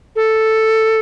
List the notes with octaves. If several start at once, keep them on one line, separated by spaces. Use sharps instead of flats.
A4